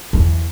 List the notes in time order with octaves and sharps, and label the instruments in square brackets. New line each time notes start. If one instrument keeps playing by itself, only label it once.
[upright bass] E2